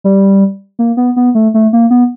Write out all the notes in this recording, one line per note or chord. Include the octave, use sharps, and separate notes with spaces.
G3
A#3
B3
B3
A3
A3
A#3
B3